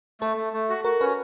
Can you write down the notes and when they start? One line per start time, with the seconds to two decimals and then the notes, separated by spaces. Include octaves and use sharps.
0.21 A3 A4
0.37 A3
0.53 A3
0.70 F#4
0.84 F#4 A#4
1.01 C#4 B4